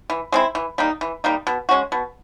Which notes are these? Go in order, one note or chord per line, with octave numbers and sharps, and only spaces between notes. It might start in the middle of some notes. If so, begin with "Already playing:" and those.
E3
G#3 C4 E4
E3
G3 A#3 D#4
E3
G3 A#3 D#4
B2
G#3 C#4 F#4
B2